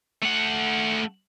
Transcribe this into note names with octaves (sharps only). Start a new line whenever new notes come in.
A3 F#5